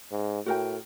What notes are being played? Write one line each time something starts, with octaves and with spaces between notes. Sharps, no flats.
G#2
A2 F#4 A#4 G5